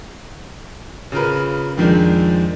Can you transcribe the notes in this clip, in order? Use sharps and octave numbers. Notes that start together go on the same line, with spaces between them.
C#3 F4 A#4 B4
F2 D#3 F3 G#3 C4 D4